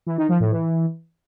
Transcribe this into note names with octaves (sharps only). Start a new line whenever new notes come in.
E3
D#3
F3
A2
E3